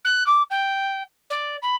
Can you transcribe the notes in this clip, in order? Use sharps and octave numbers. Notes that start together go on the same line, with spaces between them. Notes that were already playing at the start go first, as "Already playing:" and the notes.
F#6
D6
G5
D5
B5